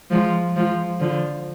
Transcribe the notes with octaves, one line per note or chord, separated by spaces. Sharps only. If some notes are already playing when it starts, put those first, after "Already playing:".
F3 G#3
F3 G#3
D3 F3